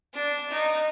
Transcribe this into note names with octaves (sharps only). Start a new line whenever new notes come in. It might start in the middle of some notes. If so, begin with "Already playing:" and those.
D4
D#4